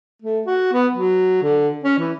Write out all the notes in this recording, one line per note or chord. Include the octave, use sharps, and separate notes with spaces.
A3
F#4
B3
F#3
D3
C#4
E3